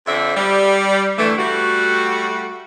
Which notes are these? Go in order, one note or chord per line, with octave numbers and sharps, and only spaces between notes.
F2 D3 C4 E5
G3
D3 E3 A3
G3 A3 F#4